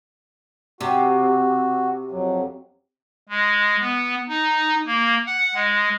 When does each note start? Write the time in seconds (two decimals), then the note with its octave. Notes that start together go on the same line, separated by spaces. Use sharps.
0.81 C3 F#4
2.11 F2 F#3
3.29 G#3
3.80 B3
4.29 D#4
4.86 A#3
5.27 F#5
5.55 G#3